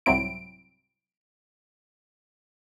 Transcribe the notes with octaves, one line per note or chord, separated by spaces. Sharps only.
C2 G#2 F#3 C4 E4 D7